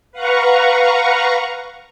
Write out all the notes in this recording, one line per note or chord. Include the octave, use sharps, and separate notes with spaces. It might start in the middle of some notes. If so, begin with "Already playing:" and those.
B4 F5 F#5 A#5 C#6